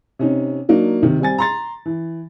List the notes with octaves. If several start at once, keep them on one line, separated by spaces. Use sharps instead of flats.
C3 C#4 D#4
F#3 A#3 D4 D#4
C3 D#3
G3 C4 G#5 A6
A#5 C6 A6
E3